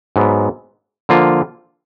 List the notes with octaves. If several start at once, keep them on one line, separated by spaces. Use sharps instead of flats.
G#2 F#3 B3
D3 F3 A#3 F4